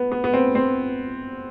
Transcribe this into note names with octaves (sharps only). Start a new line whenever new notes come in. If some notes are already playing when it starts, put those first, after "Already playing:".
Already playing: B3
B3
B3
C4
C4